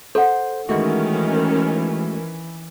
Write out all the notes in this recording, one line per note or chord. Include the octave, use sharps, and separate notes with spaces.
A4 C5 F#5
D#3 E3 G#3 A3 C#4 F#4